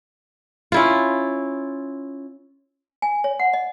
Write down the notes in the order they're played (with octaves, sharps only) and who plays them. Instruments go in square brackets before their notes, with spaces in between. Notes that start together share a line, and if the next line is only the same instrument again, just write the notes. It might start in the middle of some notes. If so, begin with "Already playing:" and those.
[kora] C#4 E4 F4
[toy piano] G#5
C#5
F#5
D#5